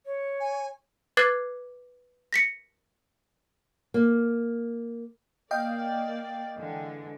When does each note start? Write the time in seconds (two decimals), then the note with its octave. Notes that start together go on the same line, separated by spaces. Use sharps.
0.06 C#5
0.40 G#5
1.17 B4 D6 F#6 G#6 A6 C7
2.33 A#6 B6 C#7
3.94 A#3
5.51 A#3 D5 D#5 F5 G5
6.55 D3 E3 G#3